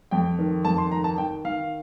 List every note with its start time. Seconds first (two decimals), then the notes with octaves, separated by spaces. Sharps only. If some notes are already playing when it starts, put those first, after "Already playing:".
0.11 F2 G5
0.39 D#3
0.65 F2 A5
0.78 C6
0.91 D#3 A#5
1.04 A5
1.18 D#3 G5
1.44 D#3 F5